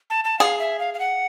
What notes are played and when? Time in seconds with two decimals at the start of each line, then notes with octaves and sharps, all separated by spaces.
0.10 A5
0.25 A5
0.39 G#4 F5
0.59 E5
0.79 F5
0.94 F5
0.99 F#5